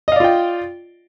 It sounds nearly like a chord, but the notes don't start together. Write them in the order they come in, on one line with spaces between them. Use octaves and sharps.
D#5 F5 D5 F4 G5